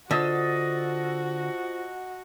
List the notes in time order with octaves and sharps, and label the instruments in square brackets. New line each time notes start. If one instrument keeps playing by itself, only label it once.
[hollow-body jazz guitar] D3 [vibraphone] F4 C5 [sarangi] F#4 [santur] D#5 A5 E6